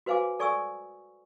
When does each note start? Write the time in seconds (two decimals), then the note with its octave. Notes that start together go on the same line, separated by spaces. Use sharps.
0.06 F#4 B4 C5 F5 G#5 D6
0.39 A4 D5 G#5 C#6 D#6 E6